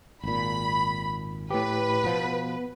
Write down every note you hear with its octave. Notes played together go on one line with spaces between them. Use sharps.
G#1 A#2 B5
A2 G4 B4
B2 F3 B3